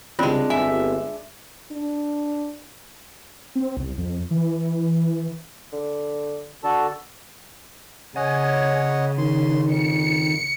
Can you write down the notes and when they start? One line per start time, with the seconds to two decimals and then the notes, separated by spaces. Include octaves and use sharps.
0.19 C2 C#3 G#3 C4 D4 F4
0.50 G1 E5 G#5
1.72 D4
3.55 C4
3.77 C2
3.98 F2
4.31 E3
5.73 D3
6.64 D3 F#4 A4 A5
8.16 C#3 C#5 D#5 F#5 G#5
9.18 D#3 C6
9.67 F2 C#7